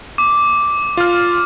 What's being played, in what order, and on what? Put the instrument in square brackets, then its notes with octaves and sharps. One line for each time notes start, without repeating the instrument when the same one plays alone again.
[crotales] D6
[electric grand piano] F4 F6